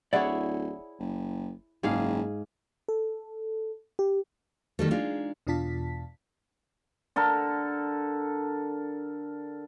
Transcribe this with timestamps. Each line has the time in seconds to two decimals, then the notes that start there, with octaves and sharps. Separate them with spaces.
0.13 D1 E4 G#4 C#5 D5 F#5
0.99 F#1
1.83 F#1 G#2 G#4 F5
2.88 A4
3.99 G4
4.79 D#3 G3 A3
4.91 G#3 D4 D#4 F4
5.47 E2 B2 D4 F4 A5 B6
7.16 D3 A4 A#4